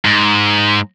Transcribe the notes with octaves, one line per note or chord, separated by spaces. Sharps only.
G#2